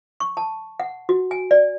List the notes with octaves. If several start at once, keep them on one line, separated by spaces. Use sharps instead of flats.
C#6
A5
F#5
F#4
G#5
D5